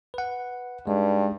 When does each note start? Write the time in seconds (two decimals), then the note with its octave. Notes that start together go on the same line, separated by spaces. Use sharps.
0.14 B4 F#5
0.87 G2 G#3 D#4